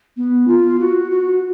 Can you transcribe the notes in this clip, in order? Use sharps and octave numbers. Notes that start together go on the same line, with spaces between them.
B3
F4
F#4
F#4